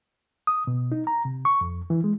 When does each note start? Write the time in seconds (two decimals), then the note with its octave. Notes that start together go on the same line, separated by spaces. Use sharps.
0.47 D#6
0.67 B2
0.92 D#4
1.07 A#5
1.25 C3
1.45 C#6
1.61 F2
1.90 E3
2.04 G#3